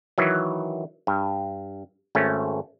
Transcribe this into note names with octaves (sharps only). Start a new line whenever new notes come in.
D#3 E3 F#3
G2
G#1 A3 C#4